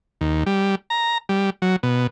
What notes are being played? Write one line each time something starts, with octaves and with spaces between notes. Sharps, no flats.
D#2
G3
A#5
G3
F#3
B2